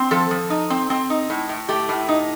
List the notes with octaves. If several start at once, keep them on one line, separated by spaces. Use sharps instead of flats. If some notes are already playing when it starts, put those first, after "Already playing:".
Already playing: C4
F3 A4
F3
D#4
C4
C4
D#4
A2
A2
A3 G4
A2
D#4